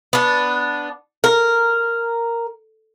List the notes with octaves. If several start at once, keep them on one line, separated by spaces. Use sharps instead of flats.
B3 D4
A#4